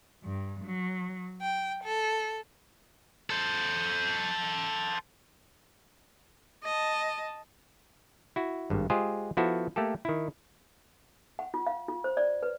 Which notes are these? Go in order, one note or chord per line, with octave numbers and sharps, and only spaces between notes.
G2
F#3
G5
A4
A4 C5
D#5 A5
E4 F#4
G#1 G2
G#3 F4 G4 G#4 C5
F3 B3 E4 F#4 A4
A3 A#3 G4 A4
D#3 E4
F#5
F4
F5
F4
C5
D5
B4